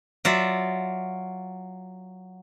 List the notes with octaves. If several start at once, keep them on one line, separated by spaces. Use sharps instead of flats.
F#3 F4 D5 E5